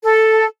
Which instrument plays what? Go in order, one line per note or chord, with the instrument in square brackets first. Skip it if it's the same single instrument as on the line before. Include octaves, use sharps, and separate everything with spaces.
[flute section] A4